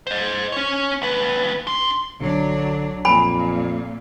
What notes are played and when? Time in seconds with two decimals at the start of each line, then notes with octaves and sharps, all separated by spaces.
0.07 C5 D#5
0.52 C#4 C#5
1.02 D#2 B4
1.67 D4 C6
2.21 B1 D3 F#3 D4
3.05 F2 A#2 G#5 B5